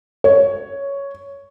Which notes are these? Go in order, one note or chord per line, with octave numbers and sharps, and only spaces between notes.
C#5